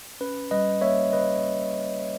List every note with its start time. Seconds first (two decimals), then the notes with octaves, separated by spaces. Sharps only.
0.21 C#4 B4
0.51 G3 B4 D#5
0.81 A#3 C#5 E5
1.12 C#3 B4 D#5